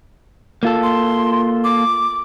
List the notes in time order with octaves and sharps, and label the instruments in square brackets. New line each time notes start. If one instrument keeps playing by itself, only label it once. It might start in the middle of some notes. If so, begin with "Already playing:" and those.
[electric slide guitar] A#3 F4 A4
[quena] C6
D6